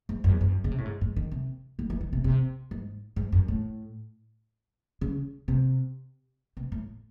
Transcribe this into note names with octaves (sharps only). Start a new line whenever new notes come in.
G#2
F#2
E2
F#2
C#3
C3
A2
G#2
G#2
D#3
C3
D#3
E3
D#3
C3
C3
G#2
G#2
F#2
A2
C#3
C3
C3
A2